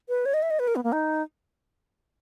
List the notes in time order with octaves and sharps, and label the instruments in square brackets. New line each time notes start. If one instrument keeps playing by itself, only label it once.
[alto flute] B4
C#5
D#5
E5
D#5
B4
A#4
B3
A#3
D#4